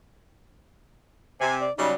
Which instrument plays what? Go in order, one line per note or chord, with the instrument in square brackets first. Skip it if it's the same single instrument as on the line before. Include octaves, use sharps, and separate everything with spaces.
[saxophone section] C3 [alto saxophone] G#5
[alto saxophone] D5
[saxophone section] C#3 F#3 G3 [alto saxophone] D#4